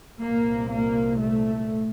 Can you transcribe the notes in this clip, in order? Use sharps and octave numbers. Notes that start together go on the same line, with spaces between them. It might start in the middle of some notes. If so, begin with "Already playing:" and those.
C2 A#2 A#3
A#3
A3